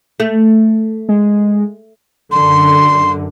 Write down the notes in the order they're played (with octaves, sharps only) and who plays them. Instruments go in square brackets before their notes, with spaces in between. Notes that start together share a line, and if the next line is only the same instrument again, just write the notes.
[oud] A3
[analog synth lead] G#3
[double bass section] F#2 D3 [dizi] C6